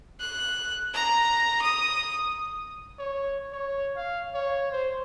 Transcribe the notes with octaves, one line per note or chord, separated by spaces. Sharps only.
F#6
A#5
D#6
C#5
C#5
F5
C#5
C5